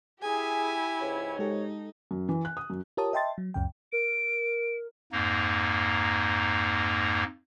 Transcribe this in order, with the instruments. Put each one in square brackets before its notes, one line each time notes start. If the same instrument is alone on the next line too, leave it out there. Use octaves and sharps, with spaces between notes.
[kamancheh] E4 G4 [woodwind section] G#4 [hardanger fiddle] G#5
[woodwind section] C#2 G#2 C#5
[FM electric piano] G#3 G4 A4 [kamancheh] D#4
[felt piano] F#2
E3
F#6
D#6
F#2
[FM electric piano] F4 G4 A#4 C#5 A5 D#6
D#5 E5 G5 A5 C6 A6
F#3
C#2 F#2 C#3 G5
[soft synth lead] A#4 [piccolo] D7
[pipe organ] F2 G#2 A#3 D#4